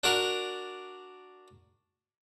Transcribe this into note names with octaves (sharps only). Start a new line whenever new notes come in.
D4 F#4 A#4 D5